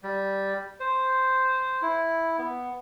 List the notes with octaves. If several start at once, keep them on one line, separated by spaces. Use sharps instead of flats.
G3
C5
E4
B3